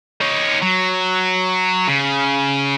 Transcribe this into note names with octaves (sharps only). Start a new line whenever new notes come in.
D#4 C#5
F#3
C#3